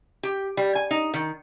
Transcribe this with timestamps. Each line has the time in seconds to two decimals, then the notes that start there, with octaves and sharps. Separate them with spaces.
0.23 G4
0.57 G3
0.75 G#5
0.91 D#4
1.14 D#3